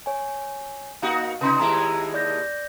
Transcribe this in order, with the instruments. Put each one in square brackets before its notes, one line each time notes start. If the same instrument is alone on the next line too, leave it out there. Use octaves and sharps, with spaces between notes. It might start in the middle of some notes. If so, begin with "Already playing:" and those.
[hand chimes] C#5 G#5
[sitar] A#3 D#4 F#4 [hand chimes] F5
[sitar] C3 D#4 [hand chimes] B4 C6
[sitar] D#2 G#3 E4 [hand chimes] A#5
[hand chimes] D5 G6 A#6